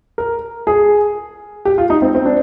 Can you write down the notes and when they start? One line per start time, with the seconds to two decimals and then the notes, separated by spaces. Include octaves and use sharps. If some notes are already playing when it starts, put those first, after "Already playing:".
0.18 A#4
0.67 G#4
1.65 G4
1.78 F4
1.90 D#4
2.02 C4
2.15 C4
2.25 D4